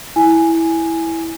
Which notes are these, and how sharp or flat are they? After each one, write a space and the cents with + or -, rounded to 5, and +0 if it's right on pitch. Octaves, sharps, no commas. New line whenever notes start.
E4 -5 G#5 +0